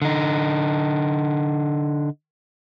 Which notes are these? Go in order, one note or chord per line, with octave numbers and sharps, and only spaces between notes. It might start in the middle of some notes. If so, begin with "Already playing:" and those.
D3 D#4